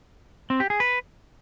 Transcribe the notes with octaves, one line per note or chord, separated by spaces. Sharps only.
C4
G4
G#4
B4